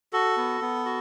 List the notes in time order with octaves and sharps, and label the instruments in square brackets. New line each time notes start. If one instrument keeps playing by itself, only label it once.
[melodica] F#4 A4
B3
B3
F#4